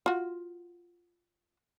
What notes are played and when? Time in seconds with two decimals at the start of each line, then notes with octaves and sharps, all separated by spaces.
0.06 F4 F#4